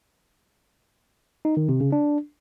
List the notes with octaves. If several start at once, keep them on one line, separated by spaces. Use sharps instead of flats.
D#4
D#3
C3
C#3
D4